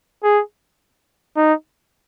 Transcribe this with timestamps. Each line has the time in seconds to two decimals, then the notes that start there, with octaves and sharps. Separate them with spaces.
0.24 G#4
1.36 D#4